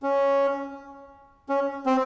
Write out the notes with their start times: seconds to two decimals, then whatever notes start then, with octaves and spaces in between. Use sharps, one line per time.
0.03 C#4
1.49 C#4
1.86 C4